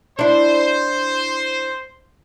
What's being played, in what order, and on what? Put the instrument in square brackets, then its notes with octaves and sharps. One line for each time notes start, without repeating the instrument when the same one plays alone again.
[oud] D4 E4 [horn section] C5